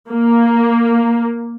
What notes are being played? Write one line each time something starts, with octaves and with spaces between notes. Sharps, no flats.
A#3